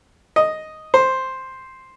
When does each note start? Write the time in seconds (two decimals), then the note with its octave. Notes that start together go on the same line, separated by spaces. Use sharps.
0.36 D#5
0.94 C5